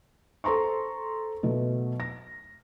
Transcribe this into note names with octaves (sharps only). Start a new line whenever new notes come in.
A4 C5 A#5 C6 C#6
B2 F#3 A3
A#6